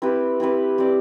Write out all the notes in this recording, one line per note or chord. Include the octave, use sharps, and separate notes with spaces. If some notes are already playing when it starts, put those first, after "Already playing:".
C4 E4 G4 B4
C4 E4 G4 B4
C4 G4 D5